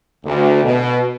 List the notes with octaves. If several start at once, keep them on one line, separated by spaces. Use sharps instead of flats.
D2
B2